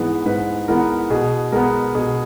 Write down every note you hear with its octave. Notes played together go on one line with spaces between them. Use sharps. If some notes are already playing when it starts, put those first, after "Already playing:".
Already playing: G#2 E3 G#3 B3
G#2 B4
E3 G#3 B3 A#4
B2 G#4
G#3 B3 A#4
B2 G#4